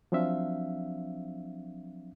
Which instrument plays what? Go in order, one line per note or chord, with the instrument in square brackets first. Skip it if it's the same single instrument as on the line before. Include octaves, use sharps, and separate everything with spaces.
[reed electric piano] F3 F#3 C4 D4 E5 F5